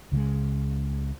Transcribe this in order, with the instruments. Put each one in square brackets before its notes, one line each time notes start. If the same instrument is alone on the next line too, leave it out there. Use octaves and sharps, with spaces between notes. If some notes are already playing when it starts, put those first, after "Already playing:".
[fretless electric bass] C#2 C#3 G3 G#3